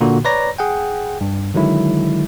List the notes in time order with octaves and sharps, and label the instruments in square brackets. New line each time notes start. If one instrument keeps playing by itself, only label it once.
[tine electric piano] A#2 D3 A#3 F#4
B4 C#5 D5 A#5 A#6
G#4 F#5 G5
G2
D3 D#3 F#3 G#3 E4